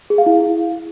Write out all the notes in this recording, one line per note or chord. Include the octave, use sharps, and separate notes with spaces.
G#4
F5
E4